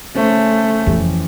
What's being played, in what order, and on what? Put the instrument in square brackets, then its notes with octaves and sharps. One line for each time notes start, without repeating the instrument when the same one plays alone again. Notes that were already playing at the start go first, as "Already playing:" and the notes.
[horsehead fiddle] A3 [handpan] C#4 C5
[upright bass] F2 [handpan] E3 G4